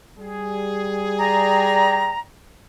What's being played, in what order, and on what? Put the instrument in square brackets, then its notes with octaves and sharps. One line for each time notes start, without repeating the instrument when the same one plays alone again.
[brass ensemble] G3 G#4
[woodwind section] D5 G5 A#5